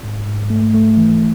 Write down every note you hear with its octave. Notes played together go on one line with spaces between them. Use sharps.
G#2
G#2
A3
A3
E3